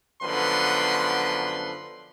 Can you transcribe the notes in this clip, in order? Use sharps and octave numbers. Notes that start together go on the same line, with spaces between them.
F#2 D3 F3 B3 B4 C6